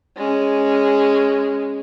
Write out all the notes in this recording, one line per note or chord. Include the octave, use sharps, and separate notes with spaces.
G#3 C#4